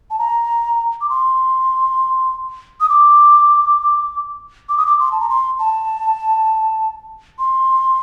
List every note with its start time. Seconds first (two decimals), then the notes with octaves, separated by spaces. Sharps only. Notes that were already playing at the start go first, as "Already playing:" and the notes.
0.11 A5
0.19 A#5
1.01 D6
1.10 C6
2.81 D#6
2.90 D6
4.69 D6
4.78 D#6
4.86 D6
5.00 C6
5.12 A5
5.20 A#5
5.29 C6
5.59 A5
7.39 C6